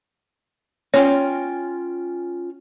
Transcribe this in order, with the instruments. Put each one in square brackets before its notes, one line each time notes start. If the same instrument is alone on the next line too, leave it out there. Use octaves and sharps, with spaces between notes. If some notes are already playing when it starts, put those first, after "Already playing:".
[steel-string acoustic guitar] C#4 F4 G5 [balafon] C#5